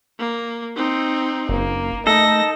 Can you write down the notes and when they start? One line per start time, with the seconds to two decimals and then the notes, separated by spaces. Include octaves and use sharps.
0.19 A#3
0.76 C4 D#4
1.49 F#1 A#3
2.07 A3 D#4 A4 A#6